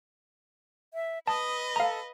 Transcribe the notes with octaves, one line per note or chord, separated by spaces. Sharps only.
E5
B4 D#5 A5 D#6
A4 F5 A#5